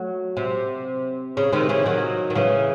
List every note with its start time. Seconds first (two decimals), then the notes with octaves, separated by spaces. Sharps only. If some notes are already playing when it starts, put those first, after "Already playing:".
Already playing: F#3 A3
0.37 C3
1.37 C#3
1.53 C3 D#3
1.69 C#3 E3
1.86 D#3 F#3
2.30 D#3
2.35 C#3 E3